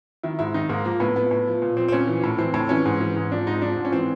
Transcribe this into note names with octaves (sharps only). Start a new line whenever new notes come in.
D#3 E4
G#2 E4
D#3 D#4
G#2 A#3
F3 A#3
A2 B3
F3 B3
A2
F3
A#2
F3 C4
C4
A#2 C#4
E3
A2
E3 C4
A2
E3 C#4
G#2
E3
G#2
F3 D4
G#2 D#4
F3 D4
G#2
C#4
E3 C4